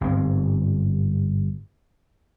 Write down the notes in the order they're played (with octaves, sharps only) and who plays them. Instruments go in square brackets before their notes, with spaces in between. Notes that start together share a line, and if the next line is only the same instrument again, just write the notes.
[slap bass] G1 G#2 C4